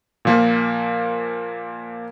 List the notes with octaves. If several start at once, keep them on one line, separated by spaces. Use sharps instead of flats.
A#2 F3 A#3